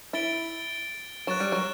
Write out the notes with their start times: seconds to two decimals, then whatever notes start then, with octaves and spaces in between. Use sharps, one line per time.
0.13 E4 A6 D7 G7
1.27 F#3 F#6 A6 E7
1.40 G3
1.52 F#3